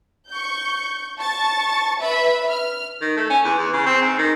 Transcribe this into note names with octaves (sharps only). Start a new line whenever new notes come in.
C#6 G6
A5 C#6 A6
B4 E5 B5
F6
D#3
A3
C#4
E2
E2
C#3
C4
G#2
D#3